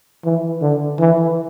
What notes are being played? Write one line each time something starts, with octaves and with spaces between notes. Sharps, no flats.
E3
D3
E3